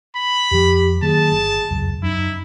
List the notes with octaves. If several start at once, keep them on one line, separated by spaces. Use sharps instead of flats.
B5
F2 F3 G4
D#3 F#3 A#3 G#4 A5
G1
F1 C#2 F#2
F#2 D#4 E4